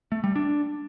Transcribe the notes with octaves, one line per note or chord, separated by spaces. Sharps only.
A3
G3
D4